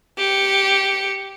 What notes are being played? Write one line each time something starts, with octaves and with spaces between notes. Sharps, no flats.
G4 C#7